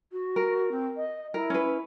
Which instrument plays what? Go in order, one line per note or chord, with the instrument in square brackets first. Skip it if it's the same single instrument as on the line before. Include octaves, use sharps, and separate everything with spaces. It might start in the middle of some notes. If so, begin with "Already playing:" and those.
[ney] F#4
[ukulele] A#4
[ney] C4
D#5
[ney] E4 [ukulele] A#4
[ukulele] C#4 B4